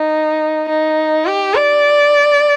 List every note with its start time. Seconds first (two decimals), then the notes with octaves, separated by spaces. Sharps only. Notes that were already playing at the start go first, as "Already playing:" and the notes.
Already playing: D#4
0.69 D#4
1.26 G4
1.55 D5